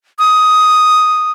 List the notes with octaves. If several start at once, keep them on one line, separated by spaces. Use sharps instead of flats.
D#6